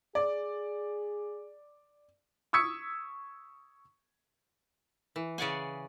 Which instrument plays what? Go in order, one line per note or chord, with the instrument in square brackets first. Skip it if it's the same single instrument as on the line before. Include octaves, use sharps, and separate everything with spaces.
[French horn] G#4 [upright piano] D5
[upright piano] C#6 D#6 E6 G#6 B6 C#7
[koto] E3
C#3 D5 F#5 G#5